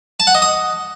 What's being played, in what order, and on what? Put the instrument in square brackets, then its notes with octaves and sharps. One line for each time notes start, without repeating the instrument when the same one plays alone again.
[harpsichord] A5
F#5
D#5
D#6